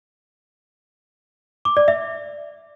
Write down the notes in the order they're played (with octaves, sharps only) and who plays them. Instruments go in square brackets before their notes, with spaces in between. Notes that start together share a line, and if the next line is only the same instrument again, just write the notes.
[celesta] D6
D5
E5